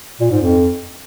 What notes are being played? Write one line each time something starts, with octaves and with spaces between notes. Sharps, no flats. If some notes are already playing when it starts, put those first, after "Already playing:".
A#2
G#2
F2